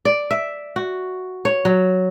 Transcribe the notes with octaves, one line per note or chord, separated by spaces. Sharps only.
D5
E5
F#4
C#5
F#3